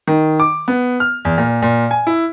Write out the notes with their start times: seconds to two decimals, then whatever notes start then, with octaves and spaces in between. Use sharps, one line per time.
0.07 D#3
0.40 D6
0.68 B3
1.00 F6
1.25 E2
1.38 A#2
1.62 A#2
1.91 G#5
2.07 E4